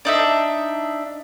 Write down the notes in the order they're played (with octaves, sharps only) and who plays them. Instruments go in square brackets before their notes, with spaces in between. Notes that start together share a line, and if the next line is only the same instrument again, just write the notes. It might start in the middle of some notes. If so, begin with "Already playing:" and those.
[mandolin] D4 D#4 E5